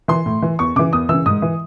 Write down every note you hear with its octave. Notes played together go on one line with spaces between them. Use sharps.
E3 C6
A2
E3
E2 C#6
C#3 E3 D6
E2 D#6
C#3 E3 E6
G#2 D#6
E3